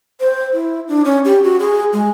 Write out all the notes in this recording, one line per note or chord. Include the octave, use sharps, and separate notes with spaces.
C5
E4
D4
C#4
G4
F#4
G#4
G#3